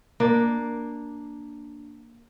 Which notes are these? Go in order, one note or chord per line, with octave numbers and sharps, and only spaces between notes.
A#3 D4